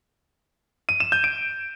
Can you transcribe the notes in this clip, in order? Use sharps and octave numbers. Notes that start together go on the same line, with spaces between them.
D#7
E7
G6
D7